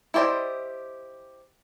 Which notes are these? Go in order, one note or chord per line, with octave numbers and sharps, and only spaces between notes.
E4 G4 C5 D5 D#5